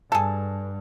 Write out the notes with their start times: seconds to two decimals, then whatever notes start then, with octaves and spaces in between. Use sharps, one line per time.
0.12 G2 G#4 A4 A5